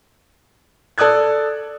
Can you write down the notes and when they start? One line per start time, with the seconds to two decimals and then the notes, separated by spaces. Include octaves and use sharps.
0.98 A4 D5 D#6 F#6 G#6